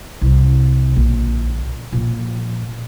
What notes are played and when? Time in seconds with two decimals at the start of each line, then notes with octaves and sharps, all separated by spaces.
0.22 C2
0.92 A#1 D3
1.93 A#2 F3